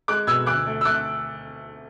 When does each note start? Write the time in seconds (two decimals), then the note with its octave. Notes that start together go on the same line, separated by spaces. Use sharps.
0.08 G#3 D6 F#6
0.27 B2 E6 G#6
0.46 D2 D6 F#6
0.66 A3
0.81 E6
0.85 A3 D6 F#6